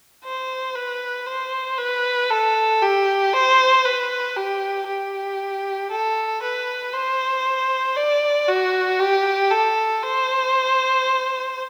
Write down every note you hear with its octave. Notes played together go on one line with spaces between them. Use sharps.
C5
B4
C5
B4
A4
G4
C5
B4
G4
G4
A4
B4
C5
D5
F#4
G4
A4
C5